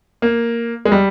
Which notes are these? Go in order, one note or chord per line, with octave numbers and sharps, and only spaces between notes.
A#3
G#3
G3